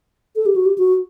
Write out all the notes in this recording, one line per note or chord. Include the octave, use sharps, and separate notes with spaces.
A4
G4
F#4
G4
F#4